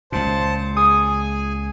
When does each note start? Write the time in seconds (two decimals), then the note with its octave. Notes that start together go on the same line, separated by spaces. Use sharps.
0.12 C#2 A#2 C5 A5
0.76 G#4 G#5 D#6